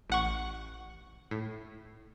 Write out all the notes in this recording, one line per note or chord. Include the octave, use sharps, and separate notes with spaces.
A1 F#5 C#6
A2